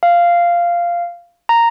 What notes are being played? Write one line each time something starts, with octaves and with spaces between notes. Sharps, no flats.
F5
A#5